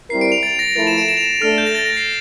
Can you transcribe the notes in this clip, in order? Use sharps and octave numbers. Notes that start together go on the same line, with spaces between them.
G3 C4 E4 A#4 C7
D7
F7
A6
A#6
F3 A3 E4 A#4 A6
E7
D7
E7
F7
E7
A3 D4 A4 F6
G6
A#6
A6
A#6
C7